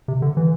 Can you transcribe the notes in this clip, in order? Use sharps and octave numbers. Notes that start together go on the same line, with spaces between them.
C3
D3
E3